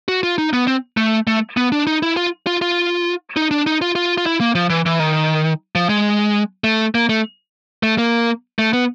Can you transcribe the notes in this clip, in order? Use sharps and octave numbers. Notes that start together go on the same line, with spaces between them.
F#4
F4
D#4
B3
C4
A3
A3
B3
D4
D#4
E4
F4
F4
F4
D#4
D4
D#4
F4
F4
F4
E4
A#3
F3
E3
E3
D#3
F3
G#3
A3
A#3
A3
A3
A#3
A3
B3